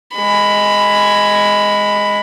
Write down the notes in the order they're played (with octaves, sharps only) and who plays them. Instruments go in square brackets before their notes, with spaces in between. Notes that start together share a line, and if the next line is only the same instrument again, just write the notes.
[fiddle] G#3 B5